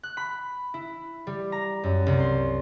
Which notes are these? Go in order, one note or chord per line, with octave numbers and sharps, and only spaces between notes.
F#6
B5
E4
G3
A#5
F#2
C2
C6